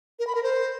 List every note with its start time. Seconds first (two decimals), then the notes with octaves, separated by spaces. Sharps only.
0.19 A#4
0.27 B5
0.35 A#4
0.43 C5